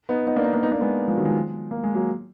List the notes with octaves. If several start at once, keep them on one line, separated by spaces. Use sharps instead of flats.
B3 D#4
B3 D#4
A#3 D4
B3 D#4
A#3 D4
B3 D#4
A#3 D4
G#3 B3
F3 G#3
D#3 F#3
F3 G#3
A#3
G#3
F#3 A#3